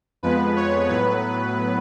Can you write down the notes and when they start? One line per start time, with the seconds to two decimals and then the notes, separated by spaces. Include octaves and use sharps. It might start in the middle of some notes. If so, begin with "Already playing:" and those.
0.23 F2 F3 G#3 B3 B4
0.56 C#5
0.89 A2 F#3 B3 B4